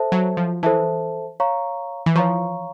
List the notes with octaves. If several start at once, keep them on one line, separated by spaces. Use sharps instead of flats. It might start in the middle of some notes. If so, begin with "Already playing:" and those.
Already playing: A4 C5 E5 A5
F#3
F3
E3 A4 C5 E5 A5
C#5 F5 A#5 C#6
E3
F3 C#5 F5 A#5 C#6